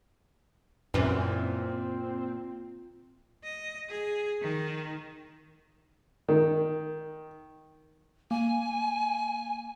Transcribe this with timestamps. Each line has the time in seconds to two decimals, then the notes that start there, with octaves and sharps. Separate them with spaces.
0.94 F#2 A#2 E3 C4
3.44 D#5
3.89 G#4
4.41 D#3
6.28 D#3
8.31 A#3 G#5